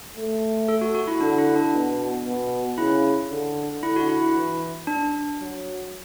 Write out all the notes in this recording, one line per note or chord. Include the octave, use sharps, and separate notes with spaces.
A3
A4
F#4
F#4
E4
D3 D4
E4
D4
B2
B2
C#3 E4
D3
D3 E4
F#4
E4
E4
E3
D4
F#3